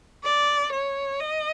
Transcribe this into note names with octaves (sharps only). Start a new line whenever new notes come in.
D5
C#5
D#5